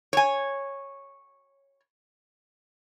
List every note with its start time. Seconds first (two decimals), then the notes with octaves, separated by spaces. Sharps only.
0.13 C#5 G#5